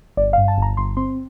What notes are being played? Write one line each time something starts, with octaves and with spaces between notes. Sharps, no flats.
G1 D5
F5
G2
A5
G1 A#5
G1 C6
C4 C6